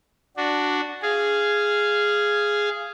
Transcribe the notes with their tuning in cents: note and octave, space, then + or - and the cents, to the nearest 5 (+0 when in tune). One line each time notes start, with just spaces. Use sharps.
D4 +0 F#4 +0
G#4 +0 F5 -15